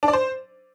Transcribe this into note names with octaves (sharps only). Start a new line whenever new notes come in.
D4
D5
C5